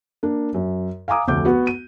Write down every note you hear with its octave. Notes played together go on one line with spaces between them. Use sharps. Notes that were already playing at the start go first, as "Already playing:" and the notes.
A#3 D4
F#2
F5 G#5 A#5 D6 D#6
F1 D2 A3 D6 G6
B3 F#4
D#7